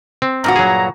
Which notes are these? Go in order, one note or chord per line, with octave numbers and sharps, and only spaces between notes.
C4
G2 A#2 F#4 A#5
F#3 G#4